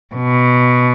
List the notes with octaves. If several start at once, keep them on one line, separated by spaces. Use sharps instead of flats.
B2